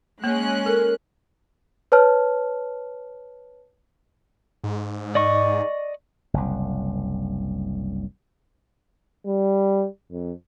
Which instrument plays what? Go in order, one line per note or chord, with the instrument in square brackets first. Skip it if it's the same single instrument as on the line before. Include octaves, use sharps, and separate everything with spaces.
[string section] G#3 C#4 F#6 [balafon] A#3
[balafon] A4 [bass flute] A#4
[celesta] B4 C#5 A5 F6
[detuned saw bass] G#2
[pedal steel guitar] D5 D#5 C#6
[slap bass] F#1 C2
[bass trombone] G3
F2